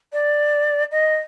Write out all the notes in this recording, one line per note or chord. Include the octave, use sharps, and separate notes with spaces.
D5
D#5